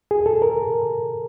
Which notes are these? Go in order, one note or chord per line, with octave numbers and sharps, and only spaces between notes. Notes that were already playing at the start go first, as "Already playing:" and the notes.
G#4
A4
A#4